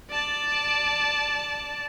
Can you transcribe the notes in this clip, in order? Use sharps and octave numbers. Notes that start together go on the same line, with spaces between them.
D5 A5